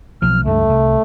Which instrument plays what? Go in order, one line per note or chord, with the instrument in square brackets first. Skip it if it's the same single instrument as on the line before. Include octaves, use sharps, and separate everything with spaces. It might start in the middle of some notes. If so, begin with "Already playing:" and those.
[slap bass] B1 F3 [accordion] F6
[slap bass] C#2 G2 [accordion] A3
[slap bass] C2